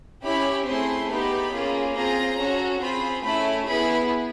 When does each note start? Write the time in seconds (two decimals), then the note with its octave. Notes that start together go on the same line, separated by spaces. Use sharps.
0.24 C#4 E4 G4 B5
0.67 A3 C4 E4 G#4 C6
1.09 B3 D#4 G4 B5
1.53 A#3 C#4 F4 G#4
1.96 C4 F4 G#4 A#5
2.39 C#4 F#4 A4
2.82 C4 F4 G#4 B5
3.24 A3 C#4 E4 B5
3.67 B3 E4 G#4 B5